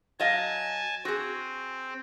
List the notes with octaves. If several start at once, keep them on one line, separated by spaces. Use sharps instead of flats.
F#3 D#5 F5 G#5 A5
C4 F#4 G#4